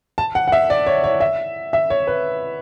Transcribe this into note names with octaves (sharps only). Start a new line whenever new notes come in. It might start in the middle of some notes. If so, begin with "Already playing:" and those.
A5
F#5
F#5
E5
D5
C#5
C#5
E5
E5
C#5
B4